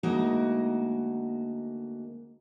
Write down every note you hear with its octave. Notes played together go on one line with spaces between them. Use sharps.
D2 G#3 A#3 D#4 F#4 D#5